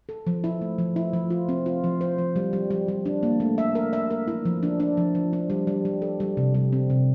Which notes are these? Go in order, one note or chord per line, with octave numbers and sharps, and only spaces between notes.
A4
F3
E4
A3
F3
E4
F3
F4
C4
F4
F3
C5
F3
G3
G3
G3
G3
D4
A#3
A3
E5
A#4
E5
A#4
E4
F3
D4
D4
F3
F3
D4
G3
G3
G3
A4
G3
C3
G3
C4
C3